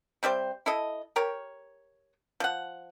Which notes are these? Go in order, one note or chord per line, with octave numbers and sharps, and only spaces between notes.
C3 G3 G4 C5
E4 A4 D#5
G4 A#4 C#5
F3 F#5